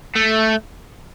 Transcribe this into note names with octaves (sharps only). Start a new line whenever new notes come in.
A3